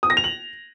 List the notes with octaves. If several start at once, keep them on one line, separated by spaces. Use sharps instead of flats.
D#6
A#6
F7
F#7